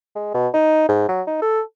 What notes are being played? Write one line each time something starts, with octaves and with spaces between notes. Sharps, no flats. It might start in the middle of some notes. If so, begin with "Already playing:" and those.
G#3
B2
D#4
G#2
F#3
D#4
A4